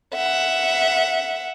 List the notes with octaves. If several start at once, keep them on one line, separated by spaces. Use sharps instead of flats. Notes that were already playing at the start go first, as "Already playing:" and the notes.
E5 F#5